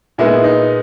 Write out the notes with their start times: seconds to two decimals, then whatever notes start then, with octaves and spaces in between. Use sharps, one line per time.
0.18 A#2 G#3 B3 D#4 E4
0.44 D#4